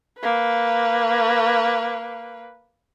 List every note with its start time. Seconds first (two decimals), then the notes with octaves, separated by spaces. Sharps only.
0.20 A#3 B4